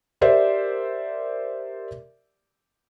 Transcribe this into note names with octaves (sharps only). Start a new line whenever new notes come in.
G4 A#4 C5 D5 E5